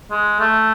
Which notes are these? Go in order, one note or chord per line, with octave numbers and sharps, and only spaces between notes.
G#3
A3